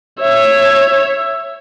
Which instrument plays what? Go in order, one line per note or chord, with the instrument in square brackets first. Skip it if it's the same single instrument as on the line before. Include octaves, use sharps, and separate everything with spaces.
[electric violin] C#5 E5